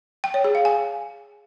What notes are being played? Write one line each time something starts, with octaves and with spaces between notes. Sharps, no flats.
G5
C#5
G#4
F5
G#5